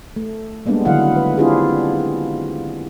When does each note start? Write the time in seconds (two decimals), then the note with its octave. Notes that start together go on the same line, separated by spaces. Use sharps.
0.16 A3
0.66 G3 G#3 A#3 B3 D4
0.85 D3 D#3 F#3 E4 F5 F#5
1.16 B4
1.37 C4 D4 E4 F4 G4 G#4